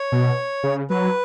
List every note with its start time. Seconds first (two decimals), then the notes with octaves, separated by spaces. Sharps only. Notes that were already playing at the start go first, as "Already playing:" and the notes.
Already playing: C#5
0.12 B2
0.63 C#3
0.90 F#3 B4